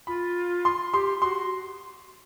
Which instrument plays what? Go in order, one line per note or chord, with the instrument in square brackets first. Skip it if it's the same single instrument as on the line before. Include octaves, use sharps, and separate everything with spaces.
[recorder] F4 [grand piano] B5
[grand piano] C6
[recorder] G4 [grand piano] C6
[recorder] F#4 [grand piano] C6